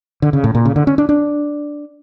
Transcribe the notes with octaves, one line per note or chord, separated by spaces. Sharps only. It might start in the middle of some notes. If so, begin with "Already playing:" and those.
D3
C#3
A2
A#2
C#3
D3
C#4
D4
D4